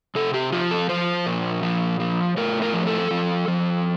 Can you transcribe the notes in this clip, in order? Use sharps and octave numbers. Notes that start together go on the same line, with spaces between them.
C3 A4
G4
F3 F4
A4
F3 C5
A#2
F3
F3
A2 A#4
A#4
F3
A4
F3
F3